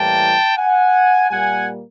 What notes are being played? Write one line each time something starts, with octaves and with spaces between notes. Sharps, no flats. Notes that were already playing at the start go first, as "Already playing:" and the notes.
Already playing: A2 E3 G3 A#3 G5 A5
F#5 G#5
A#2 G3 A#3 F#5 G#5